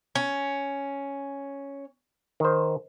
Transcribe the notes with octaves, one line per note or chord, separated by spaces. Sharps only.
C#4
D#3 C5